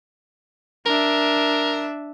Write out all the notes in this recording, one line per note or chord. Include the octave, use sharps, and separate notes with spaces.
D4 A#4 E5